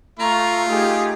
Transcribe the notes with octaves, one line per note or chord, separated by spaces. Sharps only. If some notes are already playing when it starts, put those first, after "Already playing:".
A3 F4 A#5 C#6
A3 D#4 G4 G#4